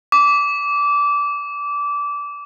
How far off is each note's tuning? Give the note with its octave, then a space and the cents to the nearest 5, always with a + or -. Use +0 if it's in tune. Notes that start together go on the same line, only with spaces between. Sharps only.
D6 -20